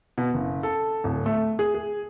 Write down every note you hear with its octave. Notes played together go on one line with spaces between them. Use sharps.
B2
F#1
A4
D1
A3
G#4
G#4